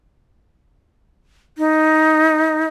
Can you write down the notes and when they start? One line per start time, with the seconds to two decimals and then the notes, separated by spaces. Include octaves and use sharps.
1.58 D#4